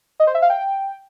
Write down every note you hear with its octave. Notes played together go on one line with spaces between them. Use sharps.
D#5
C5
E5
F5
G5